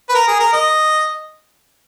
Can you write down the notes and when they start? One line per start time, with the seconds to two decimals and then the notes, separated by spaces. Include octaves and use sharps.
0.09 B4
0.15 A#4
0.27 G#4
0.39 A#4
0.53 D#5